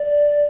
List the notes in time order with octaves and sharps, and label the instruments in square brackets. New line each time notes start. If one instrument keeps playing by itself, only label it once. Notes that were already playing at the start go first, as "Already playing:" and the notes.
Already playing: [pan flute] D5